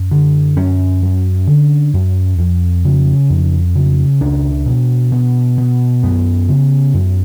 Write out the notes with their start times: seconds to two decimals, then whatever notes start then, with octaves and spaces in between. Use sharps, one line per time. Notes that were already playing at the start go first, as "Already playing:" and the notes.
Already playing: F#2
0.11 D3
0.56 F#2 C#4
1.02 F#2
1.47 D3
1.94 F#2
2.38 F2
2.84 C#3
3.29 F2
3.75 C#3
4.21 C#2 D4
4.66 B2
5.12 B2
5.58 B2
6.03 F#2 B3
6.48 C#3
6.94 F#2